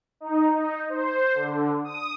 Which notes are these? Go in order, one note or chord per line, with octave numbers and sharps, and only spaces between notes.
D#4
D#4
C5
D3
D#6